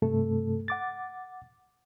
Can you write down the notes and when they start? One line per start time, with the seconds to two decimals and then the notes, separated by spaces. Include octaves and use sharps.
0.02 G2 C3 A3 A4
0.68 F#5 D6 A6